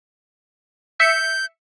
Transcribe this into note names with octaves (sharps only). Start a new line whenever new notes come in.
E5 G6 C#7